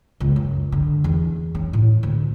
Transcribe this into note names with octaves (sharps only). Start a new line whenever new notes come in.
C#2
F#2
D3
E2
C#4
A2
D2